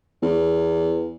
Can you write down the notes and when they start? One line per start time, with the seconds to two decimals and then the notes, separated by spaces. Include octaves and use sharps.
0.22 E2